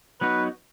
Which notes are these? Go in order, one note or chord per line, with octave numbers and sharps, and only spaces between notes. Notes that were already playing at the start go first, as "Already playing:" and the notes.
F#3 B3 D#4 F#4 B4